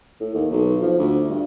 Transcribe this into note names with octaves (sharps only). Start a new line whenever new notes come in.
A2
D#2
B1
F3
D2
G2